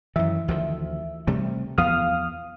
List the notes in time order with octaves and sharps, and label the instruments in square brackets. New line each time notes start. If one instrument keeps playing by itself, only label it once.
[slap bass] F#2 D#3 [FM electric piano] E3 E5
[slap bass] D2 D#3 F3
C3 G3 A3
[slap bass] E2 F3 B3 [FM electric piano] F5 D#6 F6